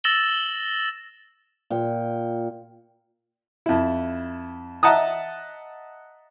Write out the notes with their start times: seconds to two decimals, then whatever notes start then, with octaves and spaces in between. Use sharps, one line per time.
0.04 E6 A6 A#6 E7 F#7 G7
1.70 A#2 G5
3.66 F2 E4
4.83 D#5 E5 F#5 A5 A#5 D#6